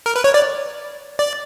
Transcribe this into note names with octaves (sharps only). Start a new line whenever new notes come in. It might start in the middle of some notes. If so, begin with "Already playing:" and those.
A#4
B4
C#5
D5
D5